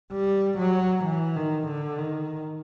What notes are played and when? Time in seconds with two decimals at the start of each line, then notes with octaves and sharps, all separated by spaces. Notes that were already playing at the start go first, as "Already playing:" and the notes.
0.12 G3
0.59 F#3
1.04 E3
1.35 D#3
1.67 D3
1.98 D#3